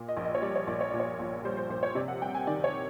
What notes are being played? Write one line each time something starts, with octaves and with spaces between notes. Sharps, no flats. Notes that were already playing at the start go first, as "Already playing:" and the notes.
Already playing: A#2
D#5
A#1
D#5
C#5
G3 D5
C#5
A#1 D5
C#5
A#2 D5
C#5
A#1
G3 C5
C5
A#1 C5
C#5
C3 D5
F#5
G3 G5
G#5
D#3 D5
C#5